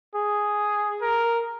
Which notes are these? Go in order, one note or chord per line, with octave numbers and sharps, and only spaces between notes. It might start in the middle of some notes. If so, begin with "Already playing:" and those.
G#4
A#4